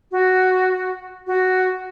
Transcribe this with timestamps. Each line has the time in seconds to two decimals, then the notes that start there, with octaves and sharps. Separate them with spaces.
0.12 F#4
1.27 F#4